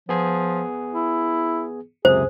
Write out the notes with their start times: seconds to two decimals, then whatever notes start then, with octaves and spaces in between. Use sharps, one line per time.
0.09 F3 B3 G#4
0.93 E4
2.05 C#2 F#2 C3 G#4 C5